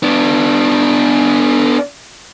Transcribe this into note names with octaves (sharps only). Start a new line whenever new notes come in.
B3 D4